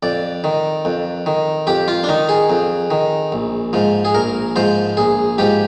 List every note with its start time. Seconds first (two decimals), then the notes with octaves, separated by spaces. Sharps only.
0.03 F2 D5
0.44 D#3
0.85 F2
1.26 D#3
1.67 F2 G4
1.88 F4
2.04 D4
2.09 D#3 D#4
2.29 G#4
2.50 F2
2.91 D#3
3.32 A#1
3.73 G#2 F3
4.05 G#4
4.15 A#1 A#4
4.56 G#2 F3 C5
4.97 A#1 G#4
5.38 G#2 F3 G4